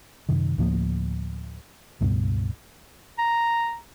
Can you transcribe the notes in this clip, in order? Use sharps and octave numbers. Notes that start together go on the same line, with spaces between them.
F#2 C3 D#3
D2 A2 F3 A#3
C#2 G2 B2
A#5